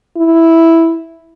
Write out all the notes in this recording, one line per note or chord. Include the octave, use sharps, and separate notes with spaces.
E4